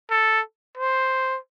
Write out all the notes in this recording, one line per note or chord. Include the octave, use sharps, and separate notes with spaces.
A4
C5